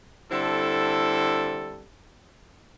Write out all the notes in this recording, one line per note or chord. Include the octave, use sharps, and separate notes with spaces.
D3 G3 C4 E4 A4